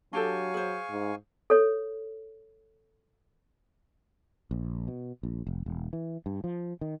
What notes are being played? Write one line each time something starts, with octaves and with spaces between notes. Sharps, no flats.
F#3 D4 G4 A4 F5 G#5 C#6
G#4 C5
G#2
A4 C#5
A#1
B2
A#1
F1
E1
E3
G2
F3
D#3